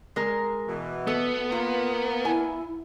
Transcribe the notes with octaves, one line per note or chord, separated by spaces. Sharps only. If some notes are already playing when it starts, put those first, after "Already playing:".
G#3 A#4
B2 E3
B3 A4
A#3 F4
E4 G#5